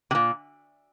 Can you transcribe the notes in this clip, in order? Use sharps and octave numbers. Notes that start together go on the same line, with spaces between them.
C3
A#2